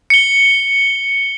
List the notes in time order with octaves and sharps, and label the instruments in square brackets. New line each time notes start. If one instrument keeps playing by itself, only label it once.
[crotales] C#7 G7